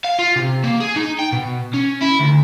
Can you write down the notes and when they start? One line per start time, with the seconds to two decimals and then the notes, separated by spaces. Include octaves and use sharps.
0.05 F5
0.19 F4
0.36 C3
0.64 A#3
0.80 G#4
0.96 D#4
1.19 G5
1.32 B2
1.74 C#4
2.02 E4
2.20 D2